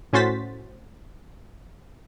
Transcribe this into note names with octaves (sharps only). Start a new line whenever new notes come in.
A2 C#4 F#4 C5 A6 B6